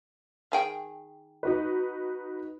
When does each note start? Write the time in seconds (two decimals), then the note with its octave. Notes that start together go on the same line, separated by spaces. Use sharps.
0.52 D#3 G#4 G5
1.43 D#4 F#4 B4